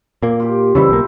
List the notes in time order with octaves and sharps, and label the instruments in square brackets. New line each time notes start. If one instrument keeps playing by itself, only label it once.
[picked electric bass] A#2 A#3
[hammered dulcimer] F4 G4
[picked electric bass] C#3 E3 G3 [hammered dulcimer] E4 A4 C5
[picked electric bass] B1 A#3